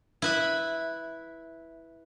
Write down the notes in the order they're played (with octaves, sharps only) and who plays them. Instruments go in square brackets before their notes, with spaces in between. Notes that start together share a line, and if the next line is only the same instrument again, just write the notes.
[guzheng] E4 B4 E5